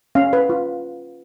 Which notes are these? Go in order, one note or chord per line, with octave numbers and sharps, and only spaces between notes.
C#4 F5
B4
F4